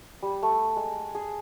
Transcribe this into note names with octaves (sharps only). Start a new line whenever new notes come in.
G3
A3
G#3
G#4